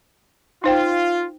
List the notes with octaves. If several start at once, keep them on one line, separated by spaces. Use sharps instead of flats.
D#4 F4 C5 G5